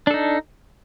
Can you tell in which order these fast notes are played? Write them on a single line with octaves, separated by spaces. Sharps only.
D4 A4 D#4